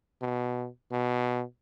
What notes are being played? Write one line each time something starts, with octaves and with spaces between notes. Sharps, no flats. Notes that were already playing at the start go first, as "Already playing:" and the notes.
B2
B2